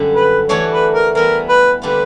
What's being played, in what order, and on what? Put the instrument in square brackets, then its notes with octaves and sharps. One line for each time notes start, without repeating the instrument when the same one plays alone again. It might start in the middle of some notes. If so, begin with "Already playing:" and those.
Already playing: [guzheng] F#2 D3 G3 A#3
[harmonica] B4
[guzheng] E3 A3 D4 F#4 [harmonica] C#5
[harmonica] B4
A#4
[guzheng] E3 G3 B3 E4 [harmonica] A#4
[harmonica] B4
[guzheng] D3 G3 A#3 D4 F4 [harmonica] B4